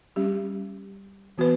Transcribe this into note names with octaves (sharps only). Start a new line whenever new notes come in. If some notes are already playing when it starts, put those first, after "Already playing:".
G3 C#4 G4
E3 B3 F#4 B4